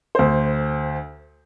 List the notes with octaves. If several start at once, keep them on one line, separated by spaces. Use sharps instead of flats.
D2 C5